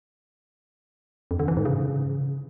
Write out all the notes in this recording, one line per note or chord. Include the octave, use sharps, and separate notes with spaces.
F2
D3
E3
G#2
C#3